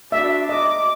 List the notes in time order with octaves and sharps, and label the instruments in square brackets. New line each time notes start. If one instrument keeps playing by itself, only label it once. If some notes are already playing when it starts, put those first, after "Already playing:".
[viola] D4 F#4 [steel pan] E5
[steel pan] D#5 [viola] D6